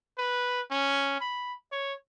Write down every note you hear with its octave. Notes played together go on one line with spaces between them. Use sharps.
B4
C#4
B5
C#5